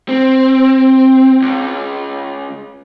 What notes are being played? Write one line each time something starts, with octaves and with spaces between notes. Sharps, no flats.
C4
C#2